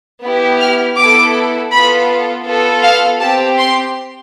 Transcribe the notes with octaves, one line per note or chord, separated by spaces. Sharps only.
B3 E4 G4
F6
B3 E4 A4 D6
B3 F4 A4 B5
B3 F4 A4
F5
C4 G4 A5
C6